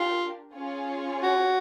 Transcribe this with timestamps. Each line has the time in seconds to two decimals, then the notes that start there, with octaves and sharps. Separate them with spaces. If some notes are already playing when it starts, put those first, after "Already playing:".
Already playing: D4 F4 G4 A#4
0.54 C#4 F4 G#4 C#5
1.23 F#4